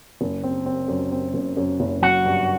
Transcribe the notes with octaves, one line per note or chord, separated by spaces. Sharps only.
F#1
C4
C4
F#2
C4
F#1
F#2
F#1
F#3 F#4
G2